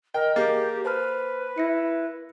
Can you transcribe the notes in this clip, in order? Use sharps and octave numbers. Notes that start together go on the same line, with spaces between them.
A#4 D#5 G5
A#3 G4 G#4 A6
B4 C5 A5 F6
E4 A#6 C#7